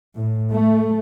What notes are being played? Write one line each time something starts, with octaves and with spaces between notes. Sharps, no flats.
A2
A3